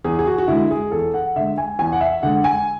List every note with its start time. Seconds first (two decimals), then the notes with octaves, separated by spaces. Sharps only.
0.04 E2 G#4
0.19 G#4
0.27 F#4
0.38 F#4
0.48 D3 G#3 E4
0.71 G#4
0.91 E2 A4
1.14 F#5
1.36 D3 G#3 E5
1.58 G#5
1.79 E2 G#5
1.92 F#5
2.01 E5
2.23 D3 G#3 F#5
2.44 G#5